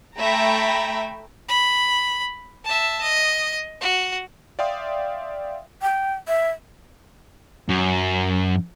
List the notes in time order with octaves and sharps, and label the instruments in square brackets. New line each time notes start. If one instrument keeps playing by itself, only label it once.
[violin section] A3 E5 G5 A#5 B5
[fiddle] B5
E5 A5
D#5
F#4
[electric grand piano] D5 E5 F5 G5 C6 D#6
[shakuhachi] G5
E5
[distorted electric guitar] F#2